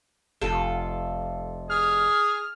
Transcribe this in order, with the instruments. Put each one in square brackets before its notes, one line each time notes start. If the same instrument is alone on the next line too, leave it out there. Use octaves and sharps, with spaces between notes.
[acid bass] F1 [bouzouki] F4 A4
[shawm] G#4 [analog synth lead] F6